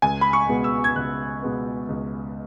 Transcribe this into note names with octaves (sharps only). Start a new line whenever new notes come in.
C#2 G#5
B5
C#6
B2 G#3 B3
E6
G#6
C#2 F#6
B2 G#3 B3
C#2